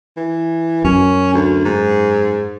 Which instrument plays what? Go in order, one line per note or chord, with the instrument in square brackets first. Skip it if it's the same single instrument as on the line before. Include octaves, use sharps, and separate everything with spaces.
[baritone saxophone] E3
[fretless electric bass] F#2 [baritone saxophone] C#4
[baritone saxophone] D2
G#2